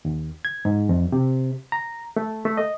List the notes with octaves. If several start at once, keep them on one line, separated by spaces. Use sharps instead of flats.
D#2
G#6
G#2
F2
C3
A#5
A3
A3
D#5